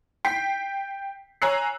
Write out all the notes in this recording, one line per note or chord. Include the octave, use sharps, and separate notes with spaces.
G5 B6 C7
C#5 G#5 A#5 E6 F#6 C7